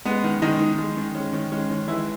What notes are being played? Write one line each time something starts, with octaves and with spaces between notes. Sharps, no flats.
G#3 B3
D#3
D#3 G#3 D#4
D#3
G#3
D#3
G#3 C#4
D#3
G#3 C#4
D#3
E3 G#3 E4